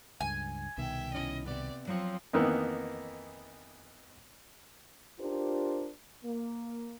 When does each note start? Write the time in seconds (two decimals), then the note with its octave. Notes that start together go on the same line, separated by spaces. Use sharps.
0.20 C#2 G2 G#5
0.78 C2 B2 D#3 E5 G5
1.14 C#4 E4 D#5
1.46 C3 B3 D5
1.87 F3 F#3 C4 C#5
2.33 F2 D#3 E3 A#3 B3 D#4
5.19 D4 F4 G4 A#4 C5
6.24 A#3